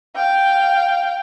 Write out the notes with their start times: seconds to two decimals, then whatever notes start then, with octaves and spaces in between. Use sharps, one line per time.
0.15 F5 G5